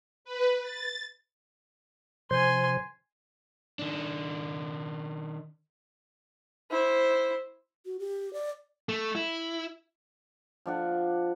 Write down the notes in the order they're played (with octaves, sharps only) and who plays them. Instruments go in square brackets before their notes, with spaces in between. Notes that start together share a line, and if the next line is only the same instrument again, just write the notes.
[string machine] B4
A6
[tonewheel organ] C3 F3 C5 [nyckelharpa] G#5 C6
[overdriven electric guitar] D#3 D4
[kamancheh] E4 C5
[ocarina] F#4
G4
D5
[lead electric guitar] A3
E4
[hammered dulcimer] F3 D4 F#5